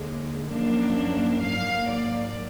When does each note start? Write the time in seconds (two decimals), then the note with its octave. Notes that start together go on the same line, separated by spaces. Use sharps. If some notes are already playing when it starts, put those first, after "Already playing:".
Already playing: D#2 D3 G#3
0.49 F#2 F3 A#3 D4
1.42 G#2 F#3 A#3 F5
1.88 D5